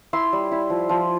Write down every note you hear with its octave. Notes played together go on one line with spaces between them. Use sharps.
E4 C6 E6
G3
E4
F3
F3